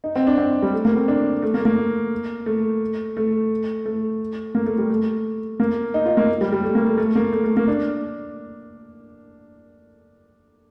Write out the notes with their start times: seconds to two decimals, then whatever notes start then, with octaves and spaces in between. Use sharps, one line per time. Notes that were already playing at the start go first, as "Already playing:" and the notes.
0.04 D#4
0.16 C4
0.27 D4
0.38 C4
0.63 G3
0.73 A3
0.85 A#3
0.96 C4
1.08 D4
1.42 A3
1.54 A#3
1.65 A#3
2.46 A3
3.17 A3
3.86 A3
4.55 A#3
4.66 A3
4.78 G3
4.90 A3
5.60 A#3
5.94 D#4
6.06 F4
6.17 A#3
6.41 G3
6.53 G3
6.64 A3
6.75 A#3
6.86 A3
6.98 A3
7.15 A#3
7.32 A3
7.44 A3
7.57 A#3
7.68 D4